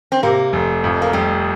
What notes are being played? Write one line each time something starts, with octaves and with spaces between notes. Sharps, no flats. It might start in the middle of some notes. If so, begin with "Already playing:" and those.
C4
C3 A#3
F1
F2
A#3
F1 G3